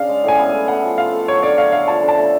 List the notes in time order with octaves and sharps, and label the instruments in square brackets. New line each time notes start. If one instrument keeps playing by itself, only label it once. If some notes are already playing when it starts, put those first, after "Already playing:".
Already playing: [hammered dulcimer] C#3 D4 [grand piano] F5
[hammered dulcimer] G#3
[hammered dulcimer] A2 [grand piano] G#5
[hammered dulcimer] B3
A2
[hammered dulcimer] A3 [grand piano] F#5
[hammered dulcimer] F3
[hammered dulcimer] F4 [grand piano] F5
[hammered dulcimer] A4
[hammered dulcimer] F#3 [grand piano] C#5
[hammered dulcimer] D3 [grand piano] D5
[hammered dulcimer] A3 [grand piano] F5
[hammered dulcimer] D3 [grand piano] F5
[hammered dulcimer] F3 [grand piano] A5
[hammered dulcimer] D3
[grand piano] A5
[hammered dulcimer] A3